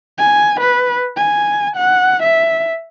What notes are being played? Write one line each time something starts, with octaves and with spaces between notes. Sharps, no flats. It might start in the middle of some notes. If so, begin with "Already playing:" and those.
G#5
B4
G#5
F#5
E5